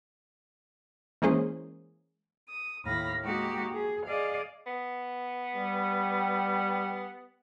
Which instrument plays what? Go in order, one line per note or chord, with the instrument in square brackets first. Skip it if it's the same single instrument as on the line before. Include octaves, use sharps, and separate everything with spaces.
[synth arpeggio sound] E3 G#3 A#3 C#4 G#4 C5
[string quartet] D#6
D#2 A2 F5 B5 A#6
G#3 A#3 D#4 F#4 G4
G#4
G#4 D5 D#5 F5
[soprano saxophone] B3
[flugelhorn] G3